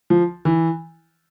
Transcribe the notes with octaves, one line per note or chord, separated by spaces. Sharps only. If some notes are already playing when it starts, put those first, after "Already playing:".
F3
E3